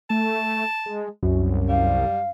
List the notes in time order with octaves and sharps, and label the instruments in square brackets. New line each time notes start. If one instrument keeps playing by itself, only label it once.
[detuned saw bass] A3 [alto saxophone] A5
[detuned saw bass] G#3
[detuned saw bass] C2 [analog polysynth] F#2
[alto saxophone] G3 [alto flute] F5